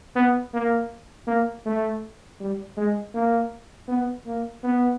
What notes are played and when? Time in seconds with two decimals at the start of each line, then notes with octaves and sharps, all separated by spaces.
0.16 B3
0.54 A#3
1.27 A#3
1.66 A3
2.40 G3
2.77 G#3
3.14 A#3
3.88 B3
4.26 A#3
4.63 B3